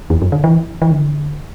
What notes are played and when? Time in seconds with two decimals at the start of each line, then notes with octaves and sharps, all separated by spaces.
0.10 E2
0.22 F#2
0.32 D3
0.44 E3
0.82 E3
0.91 D3